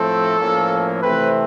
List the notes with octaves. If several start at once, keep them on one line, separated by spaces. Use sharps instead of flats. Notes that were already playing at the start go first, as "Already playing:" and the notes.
Already playing: A2 F3 A3 C4 A4
A2 F3 A#3 C#4
C3 E3 A3 C4 B4